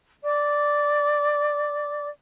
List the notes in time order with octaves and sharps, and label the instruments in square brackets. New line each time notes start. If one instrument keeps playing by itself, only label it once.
[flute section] D5 D6